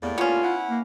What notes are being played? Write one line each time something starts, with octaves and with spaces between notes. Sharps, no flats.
E2 A2 G3 A#3
B3 C#4 F4
E4 F#5
A#3